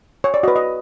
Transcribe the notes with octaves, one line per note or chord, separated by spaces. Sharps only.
C#5
D5
F#4 B4 D#5
D#5